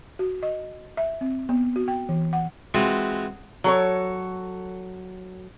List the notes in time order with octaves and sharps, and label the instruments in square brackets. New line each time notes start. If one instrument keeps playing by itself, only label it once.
[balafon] F#4
D#5
E5
C4
B3
F#4
G5
E3
F#5
[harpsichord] E3 G#3 C4 F4 F#4
[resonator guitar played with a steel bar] F#3 A4 C#5